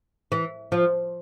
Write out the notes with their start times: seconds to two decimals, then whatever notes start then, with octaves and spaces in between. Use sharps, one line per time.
0.32 E3
0.72 F3